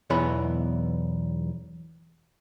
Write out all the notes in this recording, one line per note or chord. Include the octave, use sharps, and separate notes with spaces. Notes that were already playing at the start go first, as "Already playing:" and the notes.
B1 E2 E3 B3 C#5 B5